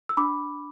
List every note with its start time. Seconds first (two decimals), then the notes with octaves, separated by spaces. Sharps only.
0.09 E6
0.17 D4 B5 D6